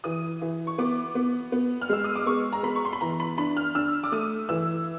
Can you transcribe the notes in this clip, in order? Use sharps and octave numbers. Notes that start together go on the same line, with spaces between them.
E3 D#6
E3
C#6
B3 D6
B3
B3
F6
G#3 E6
D#6
D6
B3 C#6
A#5
B3 B5
C#6
C6
B5
E3 A#5
B5
D4 B5
F6
D4 E6
D6
A3 D#6
E3 E6